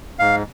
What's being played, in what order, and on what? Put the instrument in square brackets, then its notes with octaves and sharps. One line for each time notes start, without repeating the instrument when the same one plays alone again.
[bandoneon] G#2 F5